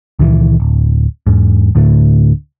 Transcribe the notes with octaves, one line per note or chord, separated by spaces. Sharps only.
C#2 A#2 D#3 E3
D1
E2 G#2
D2 A2 D3 A3